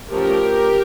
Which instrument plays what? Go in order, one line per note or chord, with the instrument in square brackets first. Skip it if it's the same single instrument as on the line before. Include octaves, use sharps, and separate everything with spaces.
[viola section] F3 A3 C#4 G4 A#4